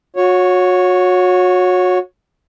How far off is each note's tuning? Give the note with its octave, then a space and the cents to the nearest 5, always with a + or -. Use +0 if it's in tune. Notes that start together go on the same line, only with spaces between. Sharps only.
F#4 -30 C#5 +0